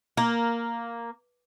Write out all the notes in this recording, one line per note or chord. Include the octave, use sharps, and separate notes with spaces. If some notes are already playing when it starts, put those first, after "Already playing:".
A#3